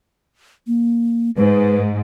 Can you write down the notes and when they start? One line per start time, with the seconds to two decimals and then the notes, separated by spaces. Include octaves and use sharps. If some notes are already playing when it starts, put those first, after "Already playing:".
0.67 A#3
1.37 G#2 B4